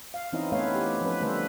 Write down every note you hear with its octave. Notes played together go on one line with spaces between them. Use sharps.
F5
E3 C4 C#4 D#4 E4 D#5
A3 B3 E4 B4 C#5 F5
G4
F3 C#4 B4
D3 G3 A3 A4 B4 C5